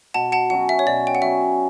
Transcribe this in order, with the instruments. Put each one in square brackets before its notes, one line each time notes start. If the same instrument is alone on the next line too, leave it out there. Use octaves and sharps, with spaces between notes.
[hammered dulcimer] B2 [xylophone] F#5 A5
[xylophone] F#5 A5
[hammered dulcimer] F#3 C#4 F#4 [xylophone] F#5
[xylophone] E5
C#5
[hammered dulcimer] B2 [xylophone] D5
[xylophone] G5
F#5
[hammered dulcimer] F#3 C#4 F#4 [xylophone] E5